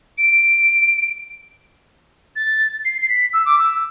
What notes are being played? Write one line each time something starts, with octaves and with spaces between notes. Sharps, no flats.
D7
A6
C7
C7
B6
E6
D6
E6